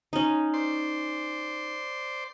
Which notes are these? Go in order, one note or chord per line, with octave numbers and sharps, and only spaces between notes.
C#4 D#4
C5 D5 C6